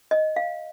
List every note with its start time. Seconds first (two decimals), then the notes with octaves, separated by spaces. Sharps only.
0.11 D#5
0.36 F5